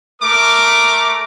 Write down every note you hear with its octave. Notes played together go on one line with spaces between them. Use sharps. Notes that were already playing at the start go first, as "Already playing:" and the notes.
A3 A#4 D6